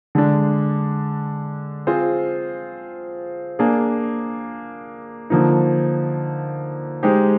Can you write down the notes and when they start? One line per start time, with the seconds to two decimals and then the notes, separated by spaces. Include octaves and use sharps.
0.15 D3 G#3 D4
1.87 C4 F4 G#4 C5
3.59 A#3 D4 G#4
5.30 D3 F3 A#3 D#4
7.03 G#3 D#4 G4 C5